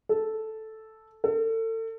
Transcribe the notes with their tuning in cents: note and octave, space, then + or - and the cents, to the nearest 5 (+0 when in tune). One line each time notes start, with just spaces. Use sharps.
A4 -5
A4 +35